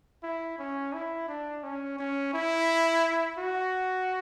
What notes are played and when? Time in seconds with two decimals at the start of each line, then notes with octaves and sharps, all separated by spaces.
0.23 E4
0.59 C#4
0.93 E4
1.28 D4
1.63 C#4
1.99 C#4
2.33 E4
3.38 F#4